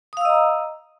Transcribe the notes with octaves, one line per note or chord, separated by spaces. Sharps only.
D#5 F5 A#5 D#6 E6